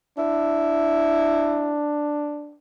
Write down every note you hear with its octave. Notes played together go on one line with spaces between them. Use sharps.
D4 E4